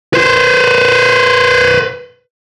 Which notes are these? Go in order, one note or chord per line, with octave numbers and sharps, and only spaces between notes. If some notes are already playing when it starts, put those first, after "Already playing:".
B4 C5